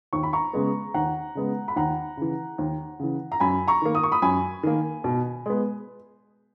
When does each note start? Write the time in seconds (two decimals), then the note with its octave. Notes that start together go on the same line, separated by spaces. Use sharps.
0.13 D#2 C#6
0.23 B5
0.33 A#5 C#6
0.53 C#3 G#3 B3
0.94 D#2 F#5 A#5
1.35 C#3 G#3 B3
1.68 B5
1.76 D#2 F#5 A#5
2.17 C#3 E3
2.58 D#2
3.00 C#3 E3
3.32 A#5
3.40 F#2 G#5 B5
3.68 A#5 C#6
3.82 D#3 A#3
3.95 D#6
4.03 C#6
4.12 B5 D#6
4.22 F#2 G#5 B5
4.63 D#3 A#3
5.04 B2
5.46 G#3 B3